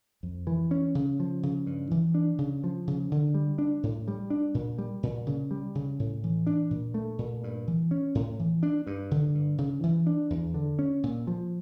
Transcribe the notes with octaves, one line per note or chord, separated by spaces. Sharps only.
F2
E3
C#4
C#3
F3
C#3
G2
E3
D4
C#3
F3
C#3
D3
G3
D4
A2
G3
D4
A#2
G3
A#2
C#3
G3
C#3
A2
E3
D4
A#2
A3
A#2
G2
E3
C#4
A2
E3
D4
G2
D3
G2
C#3
E3
D4
E2
D3
C#4
A#2
F3